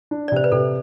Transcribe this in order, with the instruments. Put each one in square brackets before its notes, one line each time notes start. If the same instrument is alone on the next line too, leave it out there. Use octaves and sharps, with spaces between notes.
[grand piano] D4
[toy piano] D5
[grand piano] C3 [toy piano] C5
[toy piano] B4
[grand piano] C3 [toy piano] A4